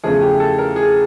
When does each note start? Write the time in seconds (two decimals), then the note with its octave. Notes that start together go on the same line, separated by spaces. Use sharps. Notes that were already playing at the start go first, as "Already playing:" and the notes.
0.04 E2 C#3 F3 A3 G#4
0.22 G4
0.40 A4
0.58 A#4
0.76 G#4